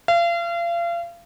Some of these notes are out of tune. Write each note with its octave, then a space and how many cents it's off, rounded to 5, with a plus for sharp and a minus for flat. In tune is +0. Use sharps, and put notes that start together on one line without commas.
F5 -35